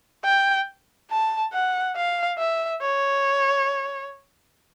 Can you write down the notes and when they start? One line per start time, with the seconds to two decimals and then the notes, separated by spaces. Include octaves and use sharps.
0.24 G5
1.10 A5
1.53 F#5
1.96 F5
2.38 E5
2.82 C#5